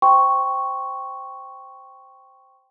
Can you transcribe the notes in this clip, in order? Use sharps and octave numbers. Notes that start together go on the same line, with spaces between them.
C5 G5 C6 C#6